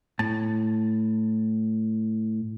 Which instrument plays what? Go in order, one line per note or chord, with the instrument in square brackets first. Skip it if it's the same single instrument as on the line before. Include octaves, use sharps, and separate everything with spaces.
[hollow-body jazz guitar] A2 A5